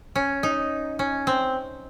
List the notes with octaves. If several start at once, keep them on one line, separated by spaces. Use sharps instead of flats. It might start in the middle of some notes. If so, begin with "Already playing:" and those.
C#4
D#4
C#4
C4